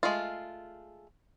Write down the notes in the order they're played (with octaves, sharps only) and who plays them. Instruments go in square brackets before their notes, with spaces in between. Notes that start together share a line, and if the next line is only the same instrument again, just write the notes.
[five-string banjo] G#3 A3 F4